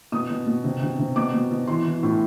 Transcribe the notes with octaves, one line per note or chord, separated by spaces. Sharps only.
B2 D#6
B2
B2
C3
C3
C3
B2 D6
B2
B2
E3 C6
E3
A2